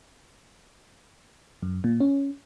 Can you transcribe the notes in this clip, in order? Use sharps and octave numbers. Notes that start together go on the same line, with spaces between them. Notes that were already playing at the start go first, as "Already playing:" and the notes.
F#2
A#2
C#4